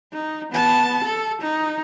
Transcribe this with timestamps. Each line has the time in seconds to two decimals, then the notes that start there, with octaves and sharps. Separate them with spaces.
0.13 D#4
0.52 B3 A5
1.04 A4
1.41 D#4